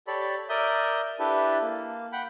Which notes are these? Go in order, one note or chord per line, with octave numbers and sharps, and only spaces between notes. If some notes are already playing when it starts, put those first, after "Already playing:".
G4 A4 C#5 D5 B5
A#4 D5 E5 D#6 G6
D4 E4 G4 A4 B4
A#3
F#5 G5 B5